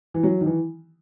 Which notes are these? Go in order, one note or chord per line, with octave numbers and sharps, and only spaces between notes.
E3
F#3
D#3
E3